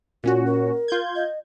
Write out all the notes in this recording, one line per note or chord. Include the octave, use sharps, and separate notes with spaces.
A#2 C#4 F4 F#4
A#4
F4 G6 G#6
D#5